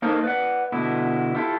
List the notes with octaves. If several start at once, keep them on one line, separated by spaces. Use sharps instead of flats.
A#3 D#4 A4 A#4 C5
B4 D5 F#5
B2 D3 B3 E4
E4 F4 G4 A4